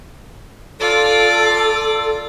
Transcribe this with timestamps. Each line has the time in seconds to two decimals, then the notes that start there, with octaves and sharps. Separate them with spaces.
0.80 F4 A4 D5